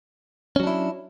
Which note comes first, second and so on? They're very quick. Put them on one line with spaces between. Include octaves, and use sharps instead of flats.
C#4 F#3 D4 E4